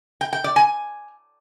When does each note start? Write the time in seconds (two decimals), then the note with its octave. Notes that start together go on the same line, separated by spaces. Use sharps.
0.21 G5
0.33 G5
0.44 D5
0.56 G#5